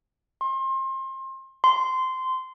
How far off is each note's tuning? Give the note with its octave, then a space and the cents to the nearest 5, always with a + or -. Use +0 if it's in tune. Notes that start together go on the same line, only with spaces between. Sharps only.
C6 +30
C6 -15